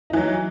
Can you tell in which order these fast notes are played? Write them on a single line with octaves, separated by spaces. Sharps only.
D#4 E3 F#3